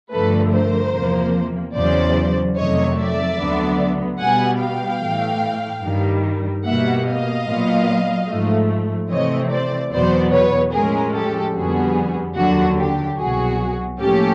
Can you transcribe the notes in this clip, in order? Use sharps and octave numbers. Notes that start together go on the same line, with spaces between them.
G2 D3 F3 A3 A4 B4
A#4 C5
E2 C3 F3 A#3
E2 C#3 F#3 C5 D5
F2 C3 D#3 F#3 A3 C#5 D#5
D5 E5
D2 D3 F#3 B3
B2 G3 B3 F#5 G#5
F5 G5
A2 E3 A3
G2 D#3 G3
B2 G3 A#3 E5 F#5
D#5 F5
A#2 F#3 B3
G#2 F3 A3
C3 E3 A3 C4 C#5 D#5
C5 D5
E2 B2 F#3 B3 C5 D5
B4 C#5
A2 F3 G#3 C#4 G#4 A#4
G4 A4
F2 D3 G3 B3 F#4 G#4
D#2 D3 F#3 F#4
G4
C2 B2 F#3 F#4 G#4
A2 F3 A#3 C#4 G4 A4